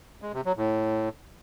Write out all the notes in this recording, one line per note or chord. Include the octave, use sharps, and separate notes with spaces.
G#3
C3
F#3
A2